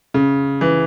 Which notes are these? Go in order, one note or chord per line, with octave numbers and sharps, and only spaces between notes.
C#3
E3